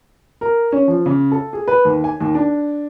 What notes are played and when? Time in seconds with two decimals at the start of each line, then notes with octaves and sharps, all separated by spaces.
0.41 A#4
0.72 C#4
0.88 F3
1.06 C#3
1.32 A4
1.53 G#4
1.68 B4
1.85 D#2
2.04 G#5
2.21 D#2
2.35 D4